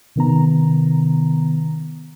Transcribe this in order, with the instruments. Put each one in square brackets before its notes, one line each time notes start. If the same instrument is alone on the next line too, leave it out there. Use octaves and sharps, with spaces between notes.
[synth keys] C3 D#3 B3 A#5